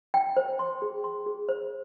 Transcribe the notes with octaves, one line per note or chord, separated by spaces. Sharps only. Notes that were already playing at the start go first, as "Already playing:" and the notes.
G5
C5
C6
G#4
C6
G#4
C5